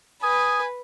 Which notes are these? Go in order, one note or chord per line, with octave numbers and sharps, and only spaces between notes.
B4 G#5 D#6